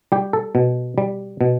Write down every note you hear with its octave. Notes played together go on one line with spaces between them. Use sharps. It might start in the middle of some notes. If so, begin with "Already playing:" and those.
G3 G4
A4
B2
G3
B2